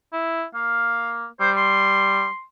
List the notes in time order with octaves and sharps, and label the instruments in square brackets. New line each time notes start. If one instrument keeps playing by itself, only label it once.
[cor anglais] E4
[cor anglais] A#3 [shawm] F5
[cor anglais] G3 [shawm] C5
[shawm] C6